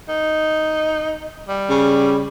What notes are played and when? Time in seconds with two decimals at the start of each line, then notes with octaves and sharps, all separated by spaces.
0.09 D#4
1.49 G3
1.69 C#3